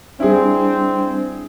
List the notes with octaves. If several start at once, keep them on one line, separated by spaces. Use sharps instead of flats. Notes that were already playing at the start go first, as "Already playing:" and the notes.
G3 C4 D4 E4 G#4